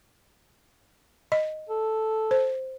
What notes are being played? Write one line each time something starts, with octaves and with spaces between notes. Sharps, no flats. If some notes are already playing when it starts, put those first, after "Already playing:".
D#5
A4
C5